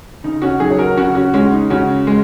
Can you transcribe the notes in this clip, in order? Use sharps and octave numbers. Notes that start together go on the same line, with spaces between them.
C#3 D#4
C#4 F#4
F#3 D#4 G#4
C#5
F#4 A#4
C#3 C#4 F#4
C#4 F#4
G#3 C#4 F#4
D#4
C#3 C#4 F#4
G#3